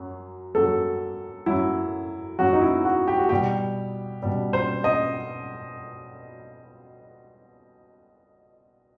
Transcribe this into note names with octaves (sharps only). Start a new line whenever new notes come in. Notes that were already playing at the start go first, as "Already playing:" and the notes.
Already playing: F#2 F#3
F#2 F#3 A4
F#2 F#3 E4
F#2 F#3 F#4
D#4
E4
F#4
G4
F#4
B2 G3 G4
B2 G3
C5
D#5